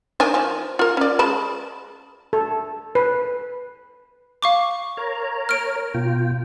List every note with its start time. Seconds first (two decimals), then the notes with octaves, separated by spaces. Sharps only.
0.20 D#3 D4 G#5
0.34 F3
0.79 F4 A#4
0.97 C#4 D5
1.19 G#3 A5 B5
2.33 A4
2.95 B4
4.42 F5 C#6 D6
4.97 A#4 C#5 A#5
5.49 F6 D7
5.94 B2 F4 G5